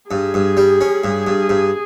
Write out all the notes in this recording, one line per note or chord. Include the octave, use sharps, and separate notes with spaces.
G2 G#4
G2
G3
C#4
G2
G2
G2